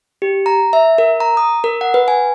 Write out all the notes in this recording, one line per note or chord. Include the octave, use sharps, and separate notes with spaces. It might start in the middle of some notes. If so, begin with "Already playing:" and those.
G4
A#5
E5
A#4
A#5
D#6
A#4
F#5
B4
G#5